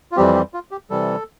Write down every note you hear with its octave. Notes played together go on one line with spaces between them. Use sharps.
F4
F2 E3 G3 C4 G4
G4
F4
G4
C3 E3 G3 A4